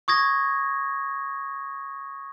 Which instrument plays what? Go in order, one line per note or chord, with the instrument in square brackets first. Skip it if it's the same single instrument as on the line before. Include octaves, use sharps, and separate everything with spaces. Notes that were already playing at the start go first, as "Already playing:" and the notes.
[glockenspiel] C#6 D#6 G#6 A#6